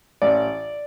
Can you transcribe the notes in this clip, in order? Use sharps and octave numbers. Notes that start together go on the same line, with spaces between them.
A1 D5